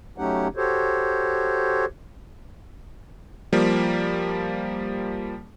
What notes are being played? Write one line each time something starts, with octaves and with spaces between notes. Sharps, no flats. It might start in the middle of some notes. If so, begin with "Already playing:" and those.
F#3 A3 C#4 D#4 G4 F#5
F#4 G4 A4 C5 C#5
F3 G3 A#3